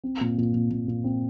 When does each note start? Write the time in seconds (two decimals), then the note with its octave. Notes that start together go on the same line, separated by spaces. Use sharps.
0.04 C4
0.21 A#2
0.38 A#2
0.54 A#2
0.71 A#2
0.88 A#2
1.04 C4